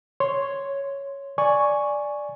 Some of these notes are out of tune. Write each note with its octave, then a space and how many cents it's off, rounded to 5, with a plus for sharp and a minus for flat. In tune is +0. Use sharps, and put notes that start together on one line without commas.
C#5 +0 C6 +0
D5 +0 G#5 +0 C#6 +0